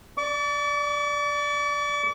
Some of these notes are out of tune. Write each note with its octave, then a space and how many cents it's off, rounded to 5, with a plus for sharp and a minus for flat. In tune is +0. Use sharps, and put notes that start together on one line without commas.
D5 +0 D6 -45